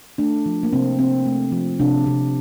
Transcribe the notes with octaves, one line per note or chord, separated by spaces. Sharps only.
A3 D4
F3
A#3
C3 C4
C3 C4
A3
F3
C3 D4
C3